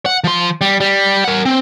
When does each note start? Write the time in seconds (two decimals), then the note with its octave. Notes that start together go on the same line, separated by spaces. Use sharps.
0.06 F#5
0.24 F3 C6
0.61 G3
0.80 G3
1.24 A#4 F#5
1.46 C4